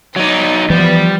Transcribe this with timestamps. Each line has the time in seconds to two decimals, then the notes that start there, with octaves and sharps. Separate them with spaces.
0.16 F#3 D#4 D5
0.70 E3 F3 G3 B3